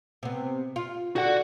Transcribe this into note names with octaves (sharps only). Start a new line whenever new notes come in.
C3 B3
F4
D3 F#4 F#5